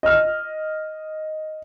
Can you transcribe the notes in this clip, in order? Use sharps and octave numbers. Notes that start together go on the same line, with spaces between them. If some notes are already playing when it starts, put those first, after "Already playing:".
D#5 F6